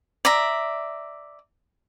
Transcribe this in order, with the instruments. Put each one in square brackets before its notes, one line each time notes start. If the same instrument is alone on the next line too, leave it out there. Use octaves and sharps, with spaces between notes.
[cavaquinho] D5 E5 A#5